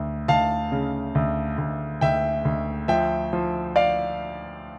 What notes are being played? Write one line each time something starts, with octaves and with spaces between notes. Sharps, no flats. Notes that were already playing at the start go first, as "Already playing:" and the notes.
Already playing: D2
D2 F5 A5
C#3
D2
D2
D2 E5 G5
D2
F3 E5 G5
F3
D5 F5